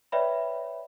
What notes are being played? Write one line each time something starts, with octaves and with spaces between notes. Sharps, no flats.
B4 C#5 D5 E5 G5 B5